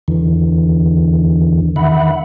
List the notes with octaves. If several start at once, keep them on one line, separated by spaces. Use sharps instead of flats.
E2 D3 E3
D#3 E5 F#5 B5